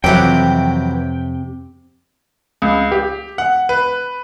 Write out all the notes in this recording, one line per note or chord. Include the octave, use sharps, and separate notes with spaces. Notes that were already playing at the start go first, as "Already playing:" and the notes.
F2 C3 E3 F#3 G4 F#5 G5
C#2
G4
F#5
B4